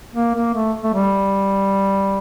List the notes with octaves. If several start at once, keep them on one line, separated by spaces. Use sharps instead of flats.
A#3
A#3
A3
A3
G3